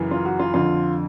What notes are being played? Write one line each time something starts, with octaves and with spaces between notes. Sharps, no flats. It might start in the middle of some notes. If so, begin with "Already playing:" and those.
Already playing: F#2 C#3 E3
F4
F#4
F4
F2 D3 F4